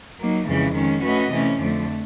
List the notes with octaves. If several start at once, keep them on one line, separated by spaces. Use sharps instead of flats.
F#3 A#3 D#4
F2 C#3 E3 G#3
D#3 G#3 C#4
A3 C#4 F#4 B4 D#5
C3 E3 A3 C#4
F2 D3 F3 A3